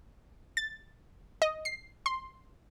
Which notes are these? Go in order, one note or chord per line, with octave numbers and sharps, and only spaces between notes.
A6
D#5
C7
C6